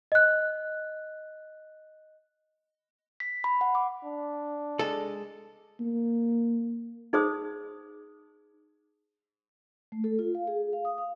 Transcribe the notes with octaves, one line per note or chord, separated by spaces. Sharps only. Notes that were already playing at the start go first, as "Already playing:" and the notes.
D#5 F#6
B6
B5
F#5
D6
D4
G#3 A4
A#3
D#4 G#4 C5 D#6
A3
A4
F4
F5
G#4
F5
D#6
F5